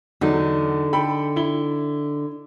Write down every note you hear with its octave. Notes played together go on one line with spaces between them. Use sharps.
E2 D3 F#3 D#4
A4 G5 B5
E4 G7